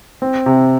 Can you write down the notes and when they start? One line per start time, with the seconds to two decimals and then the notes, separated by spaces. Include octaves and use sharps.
0.22 C4
0.46 C3